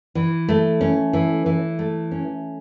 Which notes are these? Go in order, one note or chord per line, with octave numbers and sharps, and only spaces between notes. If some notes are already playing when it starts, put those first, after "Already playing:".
E3
A3
C#4
E3
E3
A3
C#4